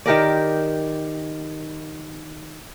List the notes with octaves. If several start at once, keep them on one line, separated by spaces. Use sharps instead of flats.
D#3 G4 A#4 D5